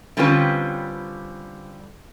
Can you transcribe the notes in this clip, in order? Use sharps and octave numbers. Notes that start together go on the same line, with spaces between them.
D3 G3 C4 C#4 F4 B4